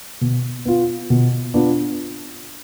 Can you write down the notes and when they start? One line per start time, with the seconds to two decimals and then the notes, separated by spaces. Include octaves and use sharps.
0.21 B2
0.65 B3 F4
1.10 B2
1.54 B3 D4 F4